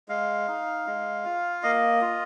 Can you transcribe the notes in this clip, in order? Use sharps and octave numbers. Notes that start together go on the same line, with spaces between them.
G#3 F5
D#4
G#3
F4
A#3 D#5
F4